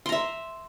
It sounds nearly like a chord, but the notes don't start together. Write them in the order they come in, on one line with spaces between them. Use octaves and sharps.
C6 A#5 E5